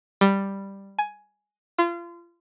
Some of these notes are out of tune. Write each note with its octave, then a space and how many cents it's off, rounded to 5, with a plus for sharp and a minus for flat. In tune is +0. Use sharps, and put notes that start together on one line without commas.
G3 +5
G#5 +10
F4 -30